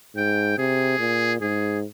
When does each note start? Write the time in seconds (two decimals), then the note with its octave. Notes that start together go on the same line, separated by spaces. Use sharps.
0.16 G#2 G5
0.58 C3 G#4
0.99 A#2
1.41 G#2 G#4